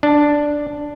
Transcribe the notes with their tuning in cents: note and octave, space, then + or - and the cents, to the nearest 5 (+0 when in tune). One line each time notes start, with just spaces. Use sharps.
D4 +0